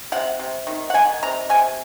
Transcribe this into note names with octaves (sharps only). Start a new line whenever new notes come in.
C3 F#5
C3
D#3
F#5
D#3 G#5
C3 A#5
C3 G#5